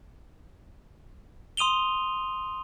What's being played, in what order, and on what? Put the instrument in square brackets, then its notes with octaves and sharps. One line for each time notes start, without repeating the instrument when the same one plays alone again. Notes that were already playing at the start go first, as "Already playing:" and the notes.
[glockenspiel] C6 D#6 D#7 F7 G7